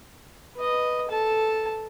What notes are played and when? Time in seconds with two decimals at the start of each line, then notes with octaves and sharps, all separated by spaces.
0.56 B4 D#5
1.09 A4 A5